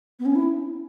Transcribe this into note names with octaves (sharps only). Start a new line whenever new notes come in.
B3
C#4
E4